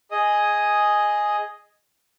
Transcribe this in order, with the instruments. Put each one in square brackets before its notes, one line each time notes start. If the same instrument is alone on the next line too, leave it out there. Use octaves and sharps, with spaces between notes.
[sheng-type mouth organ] G#4 D#5 D#6